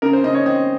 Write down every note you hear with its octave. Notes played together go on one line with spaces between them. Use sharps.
C#3 A#4
C5
C#3 D#5
C#5
C4 D#5